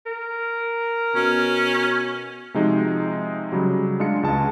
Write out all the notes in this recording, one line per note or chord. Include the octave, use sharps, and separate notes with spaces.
A#4
B2 C#4
C3 F3 G#3 D#4 F#4
C#3 F#3 G3
G#3 D4 F4 C#7
C#2 G#3 A5